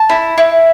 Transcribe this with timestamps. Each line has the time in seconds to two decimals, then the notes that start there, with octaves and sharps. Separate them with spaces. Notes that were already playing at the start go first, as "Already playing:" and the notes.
Already playing: A5
0.09 E4
0.38 E4